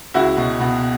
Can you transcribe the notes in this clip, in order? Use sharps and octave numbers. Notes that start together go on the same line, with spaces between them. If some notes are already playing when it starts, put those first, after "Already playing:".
C#2 E4 F#4
B2
B2